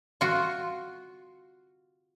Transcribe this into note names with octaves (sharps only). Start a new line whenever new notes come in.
F4 F#4